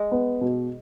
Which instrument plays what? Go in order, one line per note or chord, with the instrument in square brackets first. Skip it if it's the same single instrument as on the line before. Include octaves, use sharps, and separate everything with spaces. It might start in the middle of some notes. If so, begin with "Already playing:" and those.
Already playing: [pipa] G#3
[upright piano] B3
B2